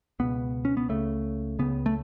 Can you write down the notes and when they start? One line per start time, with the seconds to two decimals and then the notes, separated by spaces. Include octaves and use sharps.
0.19 C#2 B2 B3
0.65 C#4
0.77 B3
0.89 C#2 C#3 A3
1.59 C#2 C#3 B3
1.86 A3